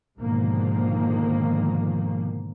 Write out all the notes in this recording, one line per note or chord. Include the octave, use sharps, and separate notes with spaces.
G#2 B2 D3 D#3 F3 A#3